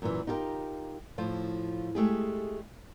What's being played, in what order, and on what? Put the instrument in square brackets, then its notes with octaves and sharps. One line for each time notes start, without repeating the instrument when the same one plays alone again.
[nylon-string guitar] F#2 A#2 E3
D#4 F4 G4 G#4 A#4
A2 F3 F4
G#3 A3 G4 G#4